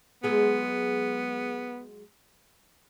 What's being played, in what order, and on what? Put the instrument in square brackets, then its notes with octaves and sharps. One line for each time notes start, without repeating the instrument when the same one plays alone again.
[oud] F#3 G#3 G#4 [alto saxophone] B3